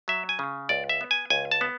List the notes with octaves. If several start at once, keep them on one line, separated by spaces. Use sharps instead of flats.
F#3 E5
G#5
C#3
C#2 D5
E5
B3
G#5
C#2 G#5
A5
B3